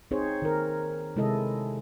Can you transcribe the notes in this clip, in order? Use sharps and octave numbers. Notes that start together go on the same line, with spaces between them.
C4 D#4 G#4 C5 C#5
D#3 A#4
C3 G#3 E4 A4 D#5